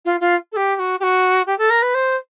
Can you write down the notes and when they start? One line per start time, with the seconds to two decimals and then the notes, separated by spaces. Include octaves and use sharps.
0.05 F4
0.20 F4
0.52 A4
0.56 G4
0.76 G4
0.79 F#4
1.00 G4
1.03 F#4
1.46 G4
1.58 A4
1.70 A#4
1.82 B4
1.94 C5